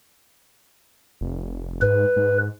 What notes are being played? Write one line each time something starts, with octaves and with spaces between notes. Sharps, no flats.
F1
G#2 B4
G#2